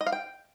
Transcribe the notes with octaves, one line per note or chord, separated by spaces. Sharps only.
D#5
F5
G5